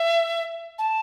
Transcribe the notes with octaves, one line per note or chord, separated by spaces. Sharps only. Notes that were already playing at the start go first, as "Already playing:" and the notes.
Already playing: E5
A5